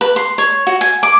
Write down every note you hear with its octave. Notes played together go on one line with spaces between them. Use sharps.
B4
C6
C#5
F#4
G#5
D6